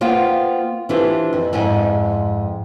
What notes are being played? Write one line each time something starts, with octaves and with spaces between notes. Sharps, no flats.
A#3 B3 F4 C5 F5 G5
E3 D4 E4 F4 G4 C5
F2
F2 G#2 E4 G#5